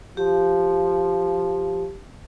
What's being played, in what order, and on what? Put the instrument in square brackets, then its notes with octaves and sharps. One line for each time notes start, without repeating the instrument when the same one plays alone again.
[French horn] F3 [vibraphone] G4